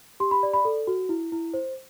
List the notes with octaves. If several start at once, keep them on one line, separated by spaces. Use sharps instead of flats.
G4 C6
B5
D5
B5
A4
F#4
E4
E4
C5